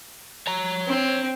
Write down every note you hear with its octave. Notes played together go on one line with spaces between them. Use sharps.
C#5 A#5
C4